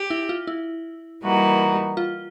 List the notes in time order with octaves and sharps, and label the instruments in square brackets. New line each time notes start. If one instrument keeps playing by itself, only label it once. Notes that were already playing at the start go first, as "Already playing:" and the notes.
Already playing: [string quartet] G4
[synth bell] E4
F4
E4
[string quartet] E3 G3 A#3 D#4 F#4
[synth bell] F4